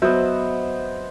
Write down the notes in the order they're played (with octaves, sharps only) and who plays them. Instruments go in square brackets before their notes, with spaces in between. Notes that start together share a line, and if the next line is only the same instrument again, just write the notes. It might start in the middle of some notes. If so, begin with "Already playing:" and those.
[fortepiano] F#3 [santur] B3 C5 [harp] D#5 E5